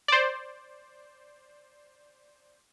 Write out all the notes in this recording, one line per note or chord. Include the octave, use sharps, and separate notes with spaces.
C5 D5